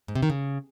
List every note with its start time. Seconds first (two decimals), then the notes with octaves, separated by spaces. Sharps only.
0.08 G#2
0.15 C3
0.23 D#3
0.30 C#3